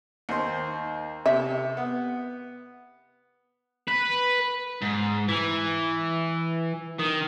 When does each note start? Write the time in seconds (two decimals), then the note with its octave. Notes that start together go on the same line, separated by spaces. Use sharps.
0.29 D#2 C5
1.26 C3 E5
1.77 B3
3.88 B4
4.82 G#2
5.28 E3
6.99 D#3